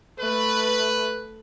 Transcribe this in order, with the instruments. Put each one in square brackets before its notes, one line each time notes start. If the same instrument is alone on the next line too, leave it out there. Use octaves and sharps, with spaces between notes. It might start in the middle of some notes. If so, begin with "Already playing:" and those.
[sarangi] A3 [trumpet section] B4